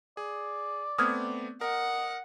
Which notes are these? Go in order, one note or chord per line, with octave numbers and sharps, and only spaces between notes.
G#4 D5
A3 B3 C4 D#6 F6 G#6
A#4 D#5 F#5